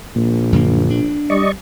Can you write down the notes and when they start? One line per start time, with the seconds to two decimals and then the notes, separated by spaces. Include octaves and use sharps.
0.16 A#1 A#2
0.52 F#2 D3 A#3
0.90 D4
1.30 G3 D5 D#5 C#6